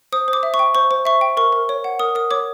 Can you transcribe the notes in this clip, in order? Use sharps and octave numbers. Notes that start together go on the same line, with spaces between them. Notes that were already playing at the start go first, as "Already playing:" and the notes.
C5 D#6
C5
D6
E5
C#6
G5
C5 C#6
C5
E5 C#6
G5
A#4 C#6
A#4
C#5
F#5
A#4 D#6
A#4 D#6
C#5 D6